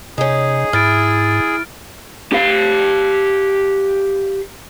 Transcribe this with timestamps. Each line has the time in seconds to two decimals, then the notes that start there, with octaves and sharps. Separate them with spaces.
0.18 C3 C#4 D#4 G#4
0.73 G#2 E4 F6 A6 D7
2.33 G4 F5